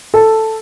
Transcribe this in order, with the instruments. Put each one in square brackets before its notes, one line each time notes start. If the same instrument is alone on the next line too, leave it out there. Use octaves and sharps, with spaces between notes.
[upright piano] A4